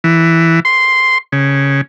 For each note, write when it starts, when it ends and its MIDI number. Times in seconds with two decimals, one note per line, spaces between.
0.04 0.60 52
0.65 1.18 84
1.32 1.81 49